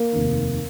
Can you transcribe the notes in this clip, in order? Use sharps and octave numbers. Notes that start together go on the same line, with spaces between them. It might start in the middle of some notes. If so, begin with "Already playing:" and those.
Already playing: A#3
F1 D#2 D#3